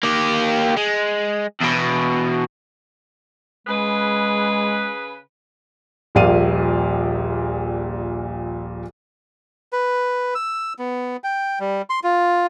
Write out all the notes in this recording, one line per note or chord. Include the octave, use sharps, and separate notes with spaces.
A#3 G4
G#3
E2 B2
C#3 G#3 G#4 B4
D#1 A#1 A#2 D5 F5 D#7
B4
E6
B3
G5
G3
C6
F4